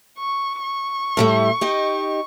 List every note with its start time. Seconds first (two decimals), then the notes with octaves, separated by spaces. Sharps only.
0.19 C#6
0.63 C#6
1.17 A2 G3 A3
1.61 D#4 G4 D#5